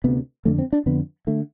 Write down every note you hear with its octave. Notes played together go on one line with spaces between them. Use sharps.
D2 C3 B3
F2 D3 A3
C4
D4
F2 D3 B3
D3 A3